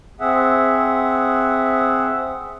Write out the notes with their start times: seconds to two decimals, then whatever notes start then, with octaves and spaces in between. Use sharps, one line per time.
0.20 C4 G#4 E5 F#5